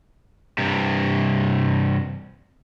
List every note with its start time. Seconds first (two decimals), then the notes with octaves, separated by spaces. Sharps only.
0.58 G2 C3